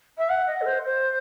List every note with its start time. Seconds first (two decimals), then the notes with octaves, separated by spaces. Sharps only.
0.17 E5
0.29 F#5
0.46 D#5
0.61 A4
0.65 C5
0.84 C5